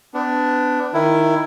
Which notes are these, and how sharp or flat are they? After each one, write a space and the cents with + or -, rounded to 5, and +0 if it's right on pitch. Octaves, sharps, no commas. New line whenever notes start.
B3 +35 D4 +0
D#3 +0 E4 +10